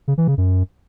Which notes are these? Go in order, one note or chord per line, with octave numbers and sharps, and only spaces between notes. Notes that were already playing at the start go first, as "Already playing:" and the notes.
C#3
E3
C#3
F#2